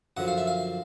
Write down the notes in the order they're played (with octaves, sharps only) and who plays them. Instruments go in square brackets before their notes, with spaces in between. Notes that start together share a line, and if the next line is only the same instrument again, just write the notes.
[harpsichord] F#2 D3 F3 F#5
F5
E5
F5